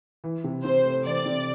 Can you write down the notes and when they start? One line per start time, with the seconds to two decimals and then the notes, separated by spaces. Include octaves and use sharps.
0.24 E3
0.44 C3
0.64 C3 C5
0.84 A3
1.05 E3 D5
1.26 C3